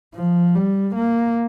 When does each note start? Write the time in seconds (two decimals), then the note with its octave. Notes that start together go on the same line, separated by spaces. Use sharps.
0.15 F3
0.55 G3
0.95 A#3